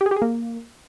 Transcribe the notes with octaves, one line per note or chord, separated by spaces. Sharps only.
G4
G#4
G4
G#4
A#3